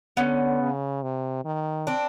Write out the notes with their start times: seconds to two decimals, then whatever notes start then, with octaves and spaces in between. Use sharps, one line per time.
0.17 D3 B3 C#4
0.60 C#3
1.03 C3
1.45 D#3
1.87 C4 D4